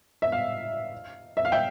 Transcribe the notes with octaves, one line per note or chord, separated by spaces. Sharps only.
E5
F5
E5
F5
E5 G5